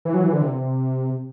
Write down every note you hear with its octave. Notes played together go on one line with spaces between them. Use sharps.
E3
F#3
E3
D3
C3